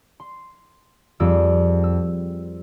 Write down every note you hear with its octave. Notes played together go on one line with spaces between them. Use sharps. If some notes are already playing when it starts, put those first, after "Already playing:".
C6
F2 G3 C4 G#4 D6 E6
E6